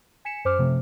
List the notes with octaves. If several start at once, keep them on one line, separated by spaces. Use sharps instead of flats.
G#5 B6 C#7 E7
F#2 C5 D6 F6
C3 F3 A3